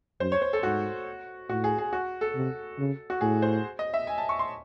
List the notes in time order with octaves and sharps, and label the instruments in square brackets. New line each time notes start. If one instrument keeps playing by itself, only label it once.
[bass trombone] F#2 [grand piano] C5
[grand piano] C#5
C5
A4
[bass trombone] G#2 [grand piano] F#4
[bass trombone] A2 [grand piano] F#4
[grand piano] G#4
G#4
F#4
A4
[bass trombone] C3
C#3
[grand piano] F#4
[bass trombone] A2 [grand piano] G#4
[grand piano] C5
D#5
E5
G#5
A5
C#6
C6